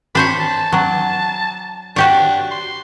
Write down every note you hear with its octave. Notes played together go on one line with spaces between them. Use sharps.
D4 C5 C#5 B5
A5
F#3 D4
D4 F#4 G4 C#5
C6